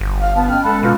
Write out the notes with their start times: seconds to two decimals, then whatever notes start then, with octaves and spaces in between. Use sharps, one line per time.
0.01 G1
0.20 F5
0.35 B3 A5
0.49 C#4 D#5 G5 F6
0.64 G#3 A4 B5 F#6
0.83 B2 F4 B4